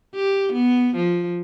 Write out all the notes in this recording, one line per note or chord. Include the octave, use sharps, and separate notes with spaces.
G4
B3
F3